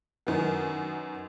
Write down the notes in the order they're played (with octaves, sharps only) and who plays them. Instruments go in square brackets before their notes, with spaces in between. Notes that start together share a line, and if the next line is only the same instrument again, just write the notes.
[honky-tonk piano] F#2 D#3 F#3 B3